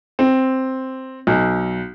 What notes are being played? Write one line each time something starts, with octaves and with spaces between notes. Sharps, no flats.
C4
B1